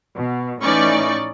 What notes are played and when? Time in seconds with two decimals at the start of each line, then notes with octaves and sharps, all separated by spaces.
0.15 B2
0.62 A2 E3 C#4 D#4 D5 C#6